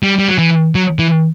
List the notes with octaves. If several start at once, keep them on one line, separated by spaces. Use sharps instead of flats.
G3
G3
F#3
E3
F#3
E3